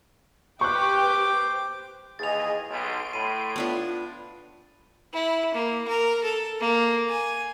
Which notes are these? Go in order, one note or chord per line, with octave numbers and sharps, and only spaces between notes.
G4 B4 C5 G5 C#6 D6 F#6
D#2 E3 G#4 D#5 A6 F7
B1 C6 D7
A2 B5 D#7
B3 D4 F4
E4
A#3
A#4
A4
A#3
G#5